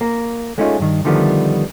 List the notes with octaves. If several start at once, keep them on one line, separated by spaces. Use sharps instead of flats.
A#3
G#3 A3 C#4 D#4 F4
G2 D#3
D3 D#3 F3 G3 A3 B3